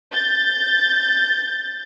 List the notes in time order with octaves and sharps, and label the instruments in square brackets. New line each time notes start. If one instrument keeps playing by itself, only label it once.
[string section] G6 A6